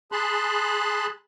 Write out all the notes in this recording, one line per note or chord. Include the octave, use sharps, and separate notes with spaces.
G#4 A5 B5 C6 F#6